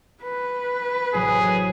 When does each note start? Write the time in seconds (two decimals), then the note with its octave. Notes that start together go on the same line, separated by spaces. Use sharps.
0.23 B4
1.14 A1 C3 F#3 G#4